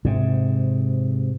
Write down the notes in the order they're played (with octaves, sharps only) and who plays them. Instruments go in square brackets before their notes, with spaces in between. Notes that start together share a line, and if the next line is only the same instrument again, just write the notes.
[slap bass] G#2 C3